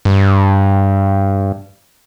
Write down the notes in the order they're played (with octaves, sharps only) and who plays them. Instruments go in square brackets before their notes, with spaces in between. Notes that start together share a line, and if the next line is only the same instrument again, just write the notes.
[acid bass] G2